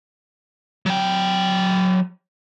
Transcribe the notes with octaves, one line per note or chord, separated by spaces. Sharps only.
F#3 G5